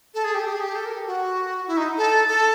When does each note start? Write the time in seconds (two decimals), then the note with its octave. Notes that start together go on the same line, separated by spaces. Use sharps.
0.14 A4
0.24 G#4
0.34 G4
0.45 G4
0.53 G#4
0.61 G4
0.76 A4
0.86 A#4
1.06 F#4
1.67 E4
1.77 D#4
1.98 A4
2.28 A4